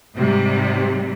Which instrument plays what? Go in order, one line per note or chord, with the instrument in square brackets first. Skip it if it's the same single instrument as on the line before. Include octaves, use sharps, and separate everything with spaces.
[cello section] G#2 C3 G3